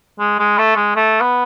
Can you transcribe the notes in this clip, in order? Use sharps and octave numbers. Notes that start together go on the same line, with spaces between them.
G#3
G#3
A3
G#3
A3
B3